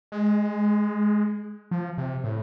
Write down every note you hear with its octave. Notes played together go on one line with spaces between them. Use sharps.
G#3
F3
C3
A2